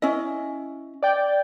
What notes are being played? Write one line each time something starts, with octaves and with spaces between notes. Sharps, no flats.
C#4 E4 D#5
D5 G5